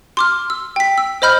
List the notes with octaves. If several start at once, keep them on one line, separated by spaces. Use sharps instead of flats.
C6 D6 F6
E6
G5 B6
E6
C5 D#5 B5 F6 G6